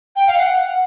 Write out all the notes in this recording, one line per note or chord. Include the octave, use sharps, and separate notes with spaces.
G5
F5
F#5